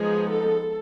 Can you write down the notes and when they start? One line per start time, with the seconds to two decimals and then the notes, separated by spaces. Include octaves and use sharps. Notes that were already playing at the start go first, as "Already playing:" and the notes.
Already playing: F3 G#3 B3 D#4 G#4
0.30 A4